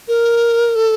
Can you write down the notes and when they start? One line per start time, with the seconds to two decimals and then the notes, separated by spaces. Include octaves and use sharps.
0.08 A#4
0.76 A4